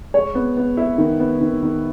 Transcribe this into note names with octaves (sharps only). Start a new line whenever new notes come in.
G#3 C#5
B3
B3
E4
D#3
B3
D#3
D#3